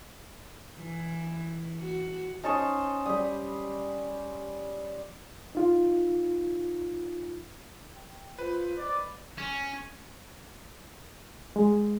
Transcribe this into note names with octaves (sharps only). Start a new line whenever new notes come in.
E3
F#4
C#4 D#4 C5 D#5 A5 C#6
G3 G4 B5 D#6
D#4 F4
G5
F4 B4 C5
D5 D#5
C#4
G#3